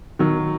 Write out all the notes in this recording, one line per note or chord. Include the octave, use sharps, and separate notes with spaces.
D#3 F#3